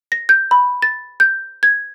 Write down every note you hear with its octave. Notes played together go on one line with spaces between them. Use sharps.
A#6
G6
B5
A6
G6
G#6